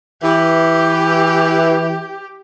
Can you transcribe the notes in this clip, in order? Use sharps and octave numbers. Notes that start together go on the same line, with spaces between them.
E3 G4